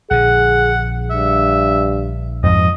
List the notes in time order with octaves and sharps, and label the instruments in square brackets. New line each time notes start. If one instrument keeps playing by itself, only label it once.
[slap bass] A#1 D3 [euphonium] G#4 [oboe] F#5
[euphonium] G2 [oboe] E5
[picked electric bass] F2 G#2 F3 [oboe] D#5